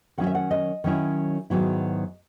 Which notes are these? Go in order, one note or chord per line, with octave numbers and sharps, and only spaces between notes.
D#3 F#3 C#4 E4 F#5
E5
F#5
D#5
D#3 F#3 C#4 E4
G#2 D#3 F#3 B3 E4